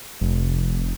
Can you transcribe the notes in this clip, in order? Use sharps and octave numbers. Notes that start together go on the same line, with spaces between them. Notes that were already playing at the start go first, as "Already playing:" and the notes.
F1